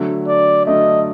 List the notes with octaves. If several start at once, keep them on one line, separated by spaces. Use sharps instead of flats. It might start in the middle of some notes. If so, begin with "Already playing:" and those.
Already playing: D3 F#3 A3
D5
D3 F#3 A3 D#5